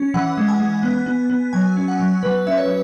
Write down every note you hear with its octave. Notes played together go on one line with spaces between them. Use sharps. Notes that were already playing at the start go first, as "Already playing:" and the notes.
Already playing: C#4
E3 F#5
G#3
G#5
G#3
B3
B3
B3
F#3 G#5
C#4
F#5
F#3
F#3 B4
C#4 E5
C#5